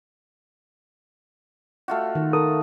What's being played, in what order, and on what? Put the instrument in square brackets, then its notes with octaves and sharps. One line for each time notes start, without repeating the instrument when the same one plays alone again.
[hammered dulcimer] A3 F4 F#4
[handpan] D#3
[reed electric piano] A4 A#4 D#6